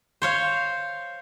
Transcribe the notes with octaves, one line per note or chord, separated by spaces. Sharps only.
C5 C#5 F5